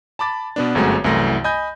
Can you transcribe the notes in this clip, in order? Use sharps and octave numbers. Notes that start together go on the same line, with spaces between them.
A5 B5 D6 A6
B2 B3 D4
G1 F#2 G#3 A3 C4 F#4
C2 F#2 E3 A3 A#6
D#5 G#5 B5 G6